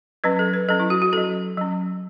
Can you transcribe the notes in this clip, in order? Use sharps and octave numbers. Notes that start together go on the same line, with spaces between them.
F#3 C#4 B4
A4
B4
F#3 C#4 A4
E4
F#4
F#4
F#3 C#4 A4
F#3 C#4